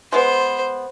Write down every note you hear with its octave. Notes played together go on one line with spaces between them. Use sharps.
G#3 B3 C5